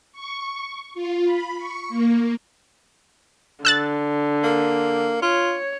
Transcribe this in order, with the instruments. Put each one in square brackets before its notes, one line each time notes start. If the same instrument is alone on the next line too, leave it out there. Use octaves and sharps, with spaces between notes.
[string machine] C#6
F4
B5
C#6
A#3
[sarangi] D3 [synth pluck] E6 F#6 A6
[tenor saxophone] A#3
[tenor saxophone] F4 [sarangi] C#5